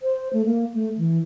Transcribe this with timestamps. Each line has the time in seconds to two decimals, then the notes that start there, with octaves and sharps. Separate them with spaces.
0.01 C5
0.33 A3
0.46 A#3
0.74 A3
0.98 E3